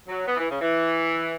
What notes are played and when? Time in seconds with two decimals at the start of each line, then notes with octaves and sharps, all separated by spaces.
0.08 F#3
0.26 B3
0.37 E3
0.49 C#3
0.60 E3